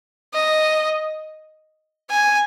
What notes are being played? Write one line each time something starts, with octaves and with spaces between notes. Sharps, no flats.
D#5
G#5